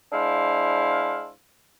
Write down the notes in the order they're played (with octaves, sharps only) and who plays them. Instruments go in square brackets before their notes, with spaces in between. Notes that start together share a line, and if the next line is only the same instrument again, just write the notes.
[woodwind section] G#3 D4 E4 C5 F5